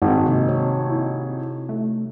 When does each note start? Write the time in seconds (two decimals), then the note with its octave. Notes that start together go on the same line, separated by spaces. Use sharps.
0.02 G#1 G2 F#4
0.26 C3 A#3 D#4
0.49 C#5
0.90 E4
1.69 A3